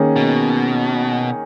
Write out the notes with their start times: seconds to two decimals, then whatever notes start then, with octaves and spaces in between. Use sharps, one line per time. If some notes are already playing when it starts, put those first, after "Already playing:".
Already playing: D#3 A#3 C#4 G#4
0.16 B2